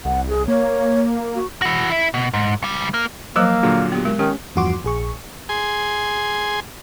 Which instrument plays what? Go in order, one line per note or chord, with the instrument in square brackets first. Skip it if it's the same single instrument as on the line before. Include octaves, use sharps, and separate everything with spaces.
[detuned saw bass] C2 [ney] F#5
[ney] G#4
[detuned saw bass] A#3 [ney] C#5
[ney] F#4
[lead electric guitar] E3 F#4
E4
B2
G#2
C#2 G3
A#3
[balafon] F3 F#3 C5 [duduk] A#3 [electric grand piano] D6 E6 F#6
[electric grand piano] A#2 D3 F#3 [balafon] G#4
[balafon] B3 G4
G#3 A#4
[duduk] D#3 [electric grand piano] C#4 [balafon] G4
[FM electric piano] E2 G2 F3 F#4 C6 D6
A#1 G#4 C#6
[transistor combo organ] G#4 G#5 C6